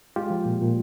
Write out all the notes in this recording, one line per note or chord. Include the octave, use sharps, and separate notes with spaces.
G#3 F4 G4
F3
A#2
A#2